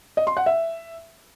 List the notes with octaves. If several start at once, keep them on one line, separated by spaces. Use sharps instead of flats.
D#5
C6
F#5
E5